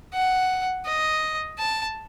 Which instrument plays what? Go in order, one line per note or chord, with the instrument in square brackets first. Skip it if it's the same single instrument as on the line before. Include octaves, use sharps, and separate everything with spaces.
[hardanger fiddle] F#5
D#5
A5